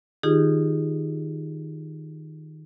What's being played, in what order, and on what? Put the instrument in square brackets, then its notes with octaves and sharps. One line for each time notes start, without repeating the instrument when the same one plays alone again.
[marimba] D#3 D#4 F4 G4 G#4